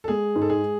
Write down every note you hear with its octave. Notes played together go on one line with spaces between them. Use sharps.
A4
G#3 G#4
G#2
A4
G#4